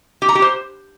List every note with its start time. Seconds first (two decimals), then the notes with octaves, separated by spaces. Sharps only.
0.22 G4
0.29 A#5
0.35 G4
0.42 C5